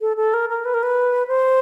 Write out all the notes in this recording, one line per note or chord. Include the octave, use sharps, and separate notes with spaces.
A4
A4
A#4
A#4
B4
A#4
B4
C5